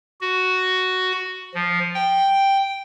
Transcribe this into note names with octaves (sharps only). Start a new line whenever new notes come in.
F#4
F3
G5